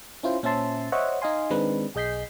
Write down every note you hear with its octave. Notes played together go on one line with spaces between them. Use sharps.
C#4 E4 F4 C5
A#2 C#4 C5 E5 A5 C6
C5 C#5 D#5 E5 F#5
D#4 D#5 F5 G#5 C6
D#3 G#3 C4 D4 D#4 B4
B1 G#4 D#5 G6 B6 C7